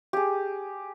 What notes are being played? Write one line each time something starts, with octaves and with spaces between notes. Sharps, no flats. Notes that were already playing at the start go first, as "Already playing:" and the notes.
G4 G#4